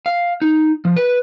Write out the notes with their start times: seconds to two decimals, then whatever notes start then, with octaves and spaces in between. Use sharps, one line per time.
0.06 F5
0.42 D#4
0.85 F3
0.97 B4